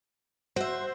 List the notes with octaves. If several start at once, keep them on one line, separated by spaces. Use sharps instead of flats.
F#4 C5 E5